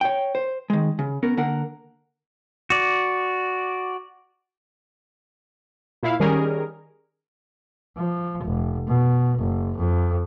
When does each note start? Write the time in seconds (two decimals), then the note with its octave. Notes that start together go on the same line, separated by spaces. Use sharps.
0.01 C#5 G5
0.35 C5
0.70 D#3 G#3
0.99 C#3
1.23 B3 C#4 A#4
1.37 D3 A#3 D4 A#4 F#5
2.70 F#4 D5
6.03 A#2 E4 F5
6.20 D#3 G3 C#4 G#4 A#4
7.97 F3
8.45 F1
8.87 B2
9.39 F#1
9.78 F2